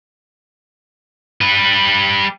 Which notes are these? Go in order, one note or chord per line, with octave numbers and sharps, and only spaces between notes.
G3 B4